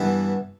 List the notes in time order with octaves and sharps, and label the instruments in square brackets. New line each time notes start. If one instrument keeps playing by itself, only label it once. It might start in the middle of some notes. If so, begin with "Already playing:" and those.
Already playing: [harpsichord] G2 E3 B3